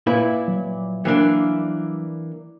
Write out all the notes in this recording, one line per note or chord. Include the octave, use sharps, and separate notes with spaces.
A#2 E4 B4
F#3
E3 A#3 D4